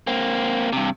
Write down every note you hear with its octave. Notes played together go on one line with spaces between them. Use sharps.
A#3 C4
G2 C3